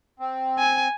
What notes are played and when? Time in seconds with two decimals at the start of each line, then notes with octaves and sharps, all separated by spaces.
0.20 C4
0.58 G#5